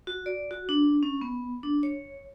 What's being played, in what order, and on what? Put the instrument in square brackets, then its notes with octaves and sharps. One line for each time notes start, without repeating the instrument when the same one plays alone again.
[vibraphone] F#4
D5
F#4
D4
C#4
B3
D4
C#5